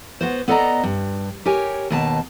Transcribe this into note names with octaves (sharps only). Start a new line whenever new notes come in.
B3 F#4 C5
B3 A4 D5 D#5 A#5
G2
G4 A#4 C#5 G#5
D#2 B2 A5